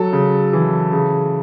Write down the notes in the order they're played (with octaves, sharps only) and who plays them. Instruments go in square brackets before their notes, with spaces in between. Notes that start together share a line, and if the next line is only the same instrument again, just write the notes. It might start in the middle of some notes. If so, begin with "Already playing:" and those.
Already playing: [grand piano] F#3 A4
C#3
E3
C#3